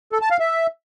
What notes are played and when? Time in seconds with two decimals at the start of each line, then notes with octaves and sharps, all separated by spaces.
0.12 A4
0.22 A5
0.31 F5
0.40 E5